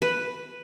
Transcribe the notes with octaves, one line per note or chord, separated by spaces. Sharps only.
B4